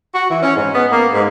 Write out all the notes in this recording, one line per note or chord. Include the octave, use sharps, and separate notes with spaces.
F#4
E3
C#4
G#2
B3
A#3
G#2